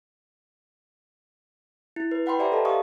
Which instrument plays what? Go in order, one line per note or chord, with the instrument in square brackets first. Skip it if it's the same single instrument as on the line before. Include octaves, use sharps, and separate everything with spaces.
[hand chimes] E4
B4
B4 F#5 G5 B5 C6
G4 C5 D5 E5 G#5 A#5
A4 D#5 A5
G4 F5 G#5 C#6 D#6